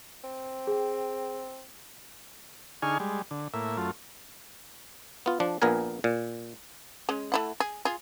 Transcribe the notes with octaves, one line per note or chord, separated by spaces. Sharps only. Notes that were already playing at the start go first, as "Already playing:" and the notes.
C4
G#4 G5
D3 D#4 G#4 G#5 C#6 F6
G3 G#3
D3
A2 A#3 E5
F#2 A3 F4
B3 F4
F3 D4
A#1 A#2 B3 A#4 G#5
A#2
G#3 C#4
A3 E4 F#5
G#4
F4 G#4